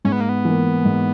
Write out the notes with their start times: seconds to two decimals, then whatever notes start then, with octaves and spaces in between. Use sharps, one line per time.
0.05 G#2 C#4
0.12 B3
0.21 A#3
0.29 B3
0.45 E3 A#3
0.85 G#2